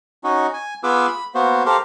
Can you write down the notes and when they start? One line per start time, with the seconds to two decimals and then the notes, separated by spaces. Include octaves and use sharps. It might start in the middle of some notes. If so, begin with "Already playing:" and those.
0.24 C#4 D#4 F#4
0.54 G#5
0.84 B3 F4 G#4 B4 D6 E6
1.07 B5
1.35 A#3 B3 F#4 C5
1.66 G4 A4 A#4 C5 F5 C6